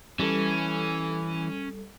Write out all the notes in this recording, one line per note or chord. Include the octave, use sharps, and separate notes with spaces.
E3 G3 C#4 A4